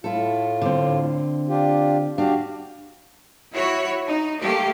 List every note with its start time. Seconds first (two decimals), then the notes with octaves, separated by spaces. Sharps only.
0.04 A2 E4 F4 A4
0.62 D3 C4
1.49 D4 F4 G4
2.18 D4 F#4 G4 F5
3.52 E4 F#4 C#5
4.07 D#4
4.41 A3 A#3 G4